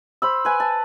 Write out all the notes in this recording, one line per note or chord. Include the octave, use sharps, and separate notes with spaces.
C5 B5 E6
B4 G#5
A5